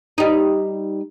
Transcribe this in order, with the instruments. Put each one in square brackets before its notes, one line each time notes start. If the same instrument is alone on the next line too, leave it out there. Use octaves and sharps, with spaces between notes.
[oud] G3 D#4